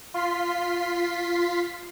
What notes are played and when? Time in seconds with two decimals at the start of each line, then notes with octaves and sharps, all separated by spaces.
0.14 F4 C6 B6 C7